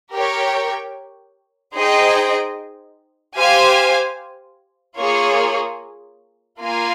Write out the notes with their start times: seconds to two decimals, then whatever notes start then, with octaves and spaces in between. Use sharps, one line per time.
0.13 G4 A#4 C#5 G5
1.75 D#4 G#4 C5 D#5 G5
3.37 G4 C5 F5 G#5
4.99 A#3 F4 G#4 C#5
6.61 A#3 F4 A#4 F5 G#5